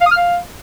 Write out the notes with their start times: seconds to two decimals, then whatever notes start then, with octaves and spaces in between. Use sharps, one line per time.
0.01 F5
0.06 D#6
0.11 F6
0.16 F5